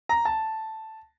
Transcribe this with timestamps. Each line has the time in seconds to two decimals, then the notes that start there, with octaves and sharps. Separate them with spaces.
0.09 A#5
0.25 A5